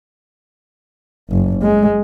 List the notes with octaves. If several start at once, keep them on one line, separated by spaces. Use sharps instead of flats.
F#1
G#3